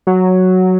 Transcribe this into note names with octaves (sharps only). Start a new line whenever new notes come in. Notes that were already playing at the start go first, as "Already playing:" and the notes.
F#3